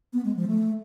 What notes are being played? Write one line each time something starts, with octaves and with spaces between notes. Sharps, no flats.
B3
G#3
F3
A3